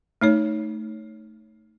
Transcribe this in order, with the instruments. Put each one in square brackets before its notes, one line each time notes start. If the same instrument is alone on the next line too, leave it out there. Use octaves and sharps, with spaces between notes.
[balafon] A3 D#4 C#5